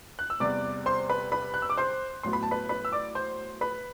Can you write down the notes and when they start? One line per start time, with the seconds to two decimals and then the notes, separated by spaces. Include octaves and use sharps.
0.19 F#6
0.30 E6
0.40 E2 C3 G3 B3 D5 D6
0.86 C5 C6
1.09 B4 B5
1.32 B4 B5
1.54 F#6
1.62 E6
1.70 D6
1.78 C5 C6
2.23 A2 F#3 B3 C6
2.33 B5
2.43 A5
2.51 B4 B5
2.69 B4 B5
2.85 E6
2.92 D5 D6
3.15 C5 C6
3.61 B4 B5